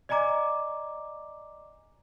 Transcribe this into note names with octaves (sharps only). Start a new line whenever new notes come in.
D5 D#5 G#5 A#5 D6